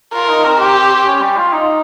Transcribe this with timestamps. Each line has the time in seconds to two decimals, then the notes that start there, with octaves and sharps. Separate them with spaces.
0.14 F4 A#4
0.29 D#4
0.45 C4
0.60 G4
1.06 C#4
1.21 G3
1.37 F4
1.53 D#4